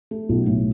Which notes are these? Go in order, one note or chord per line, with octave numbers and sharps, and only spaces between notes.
A3
B1
A2